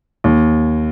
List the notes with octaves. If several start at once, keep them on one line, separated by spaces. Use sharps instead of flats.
D#2